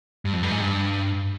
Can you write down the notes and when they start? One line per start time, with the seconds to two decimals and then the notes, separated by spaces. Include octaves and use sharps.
0.25 G2
0.33 F2
0.43 G2
0.51 G#2
0.60 G2